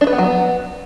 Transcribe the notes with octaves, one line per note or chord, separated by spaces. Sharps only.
D4
B4
B3
F#3
B3